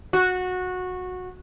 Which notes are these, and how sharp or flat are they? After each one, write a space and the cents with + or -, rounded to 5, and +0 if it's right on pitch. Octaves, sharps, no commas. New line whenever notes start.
F#4 -15